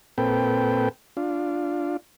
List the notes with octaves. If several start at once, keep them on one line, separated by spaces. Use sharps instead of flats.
A#2 C4 A4 B4 G5
D4 F4